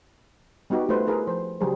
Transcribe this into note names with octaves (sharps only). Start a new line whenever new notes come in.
G3 B3 D#4 F#4 G4
A3 D#4 F4 B4 C5
E4 F4 G#4 A#4 B4
F3 C5
C#3 F#3 G3 G#4 C5